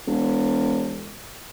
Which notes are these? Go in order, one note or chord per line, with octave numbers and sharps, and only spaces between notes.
E1